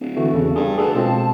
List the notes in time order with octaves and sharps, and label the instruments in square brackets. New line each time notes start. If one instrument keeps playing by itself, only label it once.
[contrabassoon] D1
[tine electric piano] D3 E3 A3 [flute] F#4
[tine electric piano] E2 C#3 [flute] A4
[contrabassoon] G2 [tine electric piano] G#4
[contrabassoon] D2 [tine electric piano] G#4 A4 B4 [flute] A5
[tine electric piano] B2 G#3 C4 [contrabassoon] F3